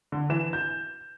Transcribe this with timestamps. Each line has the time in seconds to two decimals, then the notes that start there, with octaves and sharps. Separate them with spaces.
0.12 D3
0.30 E3 E7
0.53 G6